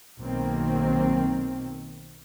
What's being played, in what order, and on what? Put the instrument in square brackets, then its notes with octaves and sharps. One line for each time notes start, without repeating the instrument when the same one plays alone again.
[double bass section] B1 D#3 A#3 C4